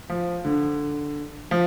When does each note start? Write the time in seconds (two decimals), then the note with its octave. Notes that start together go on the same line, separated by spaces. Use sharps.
0.09 F3
0.45 D3
1.51 F3